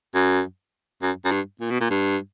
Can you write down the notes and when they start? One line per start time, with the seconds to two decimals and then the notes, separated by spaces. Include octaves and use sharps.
0.15 F#2
1.02 F#2
1.25 F#2
1.32 G2
1.61 A#2
1.71 B2
1.80 A#2
1.90 G2